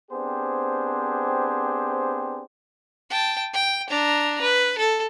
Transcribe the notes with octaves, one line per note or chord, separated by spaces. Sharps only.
B3 C4 D4 G4 G#4 C5
G5 A5
G5
D4 A#5
B4
A4